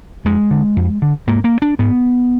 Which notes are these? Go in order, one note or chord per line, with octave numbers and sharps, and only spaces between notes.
F2 G#3
D3
F2
D3
G#2 A#3
A#3
D4
G#2 B3